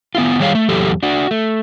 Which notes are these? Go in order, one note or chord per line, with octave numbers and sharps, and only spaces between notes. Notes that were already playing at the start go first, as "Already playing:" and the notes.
B3 E4 F4
D#3 G3 G#4 C#5 F5
A3
E2 A2 F#3 G4 A4
D4 F#4
A3